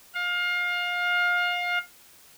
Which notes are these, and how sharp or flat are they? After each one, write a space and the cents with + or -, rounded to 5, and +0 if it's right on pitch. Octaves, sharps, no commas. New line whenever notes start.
F5 +25